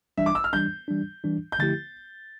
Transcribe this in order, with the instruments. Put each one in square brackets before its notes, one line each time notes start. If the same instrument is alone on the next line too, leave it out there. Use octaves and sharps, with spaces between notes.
[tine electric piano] E3 G3 D4 [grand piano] E5
[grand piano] D6
E6
F6
[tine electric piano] E3 G3 D4 [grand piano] G6
[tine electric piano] E3 G3 D4
E3 G3 D4
[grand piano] G6
[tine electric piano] D3 F3 A3 E4 G4 [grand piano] A6